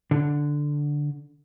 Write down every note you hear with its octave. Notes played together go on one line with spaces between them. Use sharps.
D3